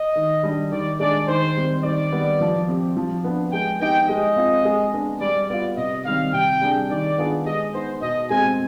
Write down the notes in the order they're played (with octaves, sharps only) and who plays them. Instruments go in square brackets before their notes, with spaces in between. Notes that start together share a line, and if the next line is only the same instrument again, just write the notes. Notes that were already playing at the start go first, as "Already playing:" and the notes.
Already playing: [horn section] D#5
[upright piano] D#3
G3 D4
[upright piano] D#3 [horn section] D5
[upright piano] G#3 D4 G#4 [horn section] D5
[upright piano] D#3 [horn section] C5
[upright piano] G3 C4
[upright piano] D#3 [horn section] D5
[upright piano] G3 B3
F3
C4 G4
F3
B3 D4
[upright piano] G#3 [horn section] G5
[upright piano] B3 D#4 G4 [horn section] G5
[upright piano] G#3 [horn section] D#5
[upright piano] C4 F4
G#3
B3 D4 G#4
[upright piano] G3 [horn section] D5
[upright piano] B3 F4 [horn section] D5
[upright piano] C3 [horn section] D#5
[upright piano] D#3 G3 C4 [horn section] F5
[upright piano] C3 [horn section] G5
[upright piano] G3 D4 G#4
[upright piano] D#3 [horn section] D5
[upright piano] B3 D4 F4 G#4
[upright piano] G#3 [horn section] D#5
[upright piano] B3 D#4 [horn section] C5
[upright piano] B2 [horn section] D#5
[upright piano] G#3 C4 [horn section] G#5